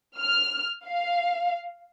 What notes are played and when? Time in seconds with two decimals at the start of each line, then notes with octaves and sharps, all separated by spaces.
0.19 F6
0.85 F5